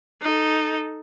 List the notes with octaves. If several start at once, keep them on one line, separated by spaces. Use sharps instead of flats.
D#4 A4